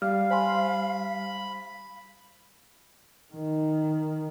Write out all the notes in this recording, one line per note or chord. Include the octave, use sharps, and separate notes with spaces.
G3 F5 F6
C5 G#5 B5 C6
D#3